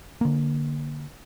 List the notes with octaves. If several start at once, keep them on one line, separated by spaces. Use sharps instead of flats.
D3 A#3